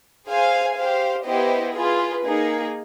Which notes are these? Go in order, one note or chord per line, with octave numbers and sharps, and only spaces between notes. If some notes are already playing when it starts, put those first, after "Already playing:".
G#4 C5 F5 G#5
G4 C5 F5
B3 E4 G4 C5 D#5
F4 G#4 B4
A#3 D#4 G#4